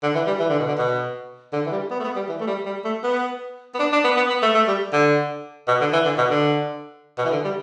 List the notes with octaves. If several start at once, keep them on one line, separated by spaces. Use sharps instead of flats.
D3
E3
G3
E3
D3
B2
D3
B2
D3
E3
G3
B3
A3
B3
G3
E3
A3
G3
G3
A3
B3
B3
D4
D4
B3
B3
B3
A3
A3
G3
D3
B2
D3
E3
D3
B2
D3
B2
E3
D3
G3